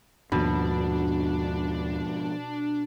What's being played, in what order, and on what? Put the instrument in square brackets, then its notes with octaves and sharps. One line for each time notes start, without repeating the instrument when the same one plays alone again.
[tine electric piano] D#2 A5 B5 [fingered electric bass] G#2 F3 [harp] B2 [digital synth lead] D4